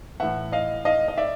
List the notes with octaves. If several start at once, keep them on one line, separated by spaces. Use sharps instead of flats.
A2 E3 E5 F#5
D#5 F5
D#5 F5
D#5
D5 E5